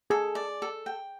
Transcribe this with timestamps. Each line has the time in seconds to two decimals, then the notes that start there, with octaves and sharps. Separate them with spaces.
0.10 G#4 A4
0.35 D5
0.62 A4
0.86 G5